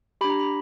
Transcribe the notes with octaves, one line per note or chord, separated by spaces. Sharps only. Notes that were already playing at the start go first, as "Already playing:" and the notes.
D4 G4 B5
A#5
B5